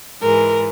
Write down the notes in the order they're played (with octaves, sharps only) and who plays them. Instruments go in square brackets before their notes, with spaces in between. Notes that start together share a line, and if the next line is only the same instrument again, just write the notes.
[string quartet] G#2 E3 G#3 A#4